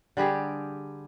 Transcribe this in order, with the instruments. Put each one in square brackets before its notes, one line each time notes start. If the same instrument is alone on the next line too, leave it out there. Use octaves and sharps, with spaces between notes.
[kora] D3 G3 G4 G#4